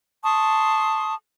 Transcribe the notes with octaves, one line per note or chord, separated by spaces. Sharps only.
A5 C6 C#6 D#6